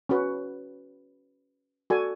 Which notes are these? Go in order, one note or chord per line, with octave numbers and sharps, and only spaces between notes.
C#4 F#4 B4
F#4 A4 D5 G#5